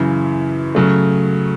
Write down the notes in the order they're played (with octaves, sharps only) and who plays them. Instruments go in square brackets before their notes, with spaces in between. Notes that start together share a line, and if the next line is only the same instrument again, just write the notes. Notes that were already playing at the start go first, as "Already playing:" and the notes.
Already playing: [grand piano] F#2 C#3 E3
C#3 F#3 A3